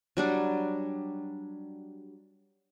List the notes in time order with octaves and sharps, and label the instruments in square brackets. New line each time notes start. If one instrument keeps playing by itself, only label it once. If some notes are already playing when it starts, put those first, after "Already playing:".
[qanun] F#3 G3 D4